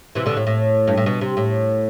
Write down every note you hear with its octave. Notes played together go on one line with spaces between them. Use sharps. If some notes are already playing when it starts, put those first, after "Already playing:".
C3 E3
B2 D3
A2
A2
G2
A2
B2
C3
A2